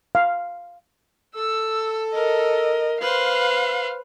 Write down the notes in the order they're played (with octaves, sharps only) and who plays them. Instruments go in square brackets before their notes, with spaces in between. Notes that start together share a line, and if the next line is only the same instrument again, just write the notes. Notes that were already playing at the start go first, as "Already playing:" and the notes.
[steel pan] F5
[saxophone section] A4 [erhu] E6
[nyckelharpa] A#4 [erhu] D#5
[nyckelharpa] B4 C5 [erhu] F5